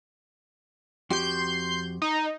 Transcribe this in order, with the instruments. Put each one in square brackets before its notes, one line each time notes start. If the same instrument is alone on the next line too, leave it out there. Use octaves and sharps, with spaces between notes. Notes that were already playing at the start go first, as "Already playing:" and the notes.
[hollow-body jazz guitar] F2 F#4 G4 [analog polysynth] C6 G6
[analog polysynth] D#4